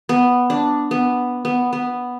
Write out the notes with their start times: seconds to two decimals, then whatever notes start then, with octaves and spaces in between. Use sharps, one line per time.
0.09 B3
0.50 D4
0.91 B3
1.45 B3
1.73 B3